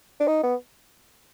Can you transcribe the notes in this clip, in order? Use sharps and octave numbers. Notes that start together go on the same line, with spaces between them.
D4
D#4
B3